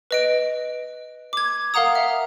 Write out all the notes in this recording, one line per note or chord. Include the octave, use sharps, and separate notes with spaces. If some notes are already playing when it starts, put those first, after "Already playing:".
B4 D#5 D7
D6 G#6
A#4 F5 F#5 A#5 D#6
E5